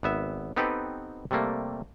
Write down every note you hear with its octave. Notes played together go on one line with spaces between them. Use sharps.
G#1 B3 E5
B3 C4 D#4 G4 A4 B4
C3 G3 A3 A#3